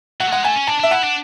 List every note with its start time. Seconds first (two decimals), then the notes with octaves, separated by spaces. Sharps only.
0.20 F#3 F#5
0.28 A3
0.32 G#3 F#5
0.44 A3 G#5
0.55 C#4
0.67 D4 A5
0.79 D4 E5
0.91 E4 F#5
1.04 D4